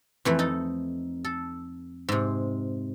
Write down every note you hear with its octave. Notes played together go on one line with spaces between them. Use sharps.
F2 E3 A3
D#4 A4
A4
G#2 C3